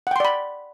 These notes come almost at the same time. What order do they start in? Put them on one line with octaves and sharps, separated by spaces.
F#5 G5 C6 D5 B5